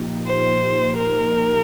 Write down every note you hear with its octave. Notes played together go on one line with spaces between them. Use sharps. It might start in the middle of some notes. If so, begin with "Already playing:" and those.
Already playing: A#2 F3 A#3 D#4 G4
C5
A#4